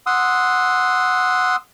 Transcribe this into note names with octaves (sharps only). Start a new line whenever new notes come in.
F#5 C6 D#6 E6